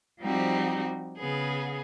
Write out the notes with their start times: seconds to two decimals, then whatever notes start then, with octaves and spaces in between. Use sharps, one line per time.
0.21 F3 G3 C4 D#4 F#4 G4
1.18 C#3 B3 G#4